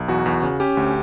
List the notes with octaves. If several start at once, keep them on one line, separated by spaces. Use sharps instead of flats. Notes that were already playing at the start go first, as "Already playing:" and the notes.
Already playing: B1
E2 F#4
E2
C#3
C#4 G4
D2